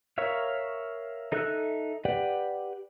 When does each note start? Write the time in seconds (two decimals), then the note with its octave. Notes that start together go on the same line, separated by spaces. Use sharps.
0.18 A#4 C#5 E5 F5
1.32 D#4 A4 E5 E6 F#6
2.05 G4 B4 D5 F#5 G5